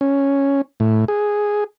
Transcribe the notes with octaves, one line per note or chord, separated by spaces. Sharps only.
C#4
A2
G#4